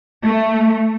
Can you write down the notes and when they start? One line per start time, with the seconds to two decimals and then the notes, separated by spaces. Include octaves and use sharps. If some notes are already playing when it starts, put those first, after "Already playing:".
0.25 A3